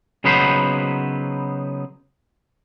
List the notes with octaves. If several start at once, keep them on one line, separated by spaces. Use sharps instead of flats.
C#3 F#3 B3 D#4 B4 C5